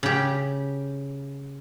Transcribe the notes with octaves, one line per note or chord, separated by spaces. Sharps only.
C#3 G4